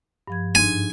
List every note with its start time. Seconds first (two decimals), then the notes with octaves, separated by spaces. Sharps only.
0.27 G2 F3 G#6
0.55 G#2 D4 D#4 G#5